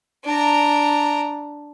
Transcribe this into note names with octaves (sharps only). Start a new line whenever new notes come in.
D4 A#5